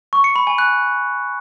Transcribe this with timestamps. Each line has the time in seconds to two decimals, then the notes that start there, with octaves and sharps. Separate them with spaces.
0.13 C#6
0.24 C#7
0.36 B5
0.47 G#5
0.58 F#6